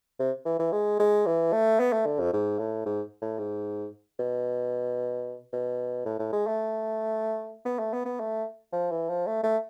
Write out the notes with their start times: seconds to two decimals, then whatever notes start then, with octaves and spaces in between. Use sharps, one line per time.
0.19 C3
0.46 E3
0.59 E3
0.72 G#3
1.00 G#3
1.26 E3
1.52 A3
1.80 B3
1.93 A3
2.06 D3
2.19 F2
2.33 G#2
2.59 A2
2.86 G#2
3.22 A2
3.39 G#2
4.19 B2
5.53 B2
6.06 A2
6.19 A2
6.32 G#3
6.47 A3
7.66 B3
7.79 A3
7.93 B3
8.06 B3
8.20 A3
8.73 F3
8.91 E3
9.09 F3
9.27 A3
9.43 A3